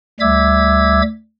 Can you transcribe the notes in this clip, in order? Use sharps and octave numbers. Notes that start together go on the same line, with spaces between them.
D2 G3 E5 D6 E6 G#6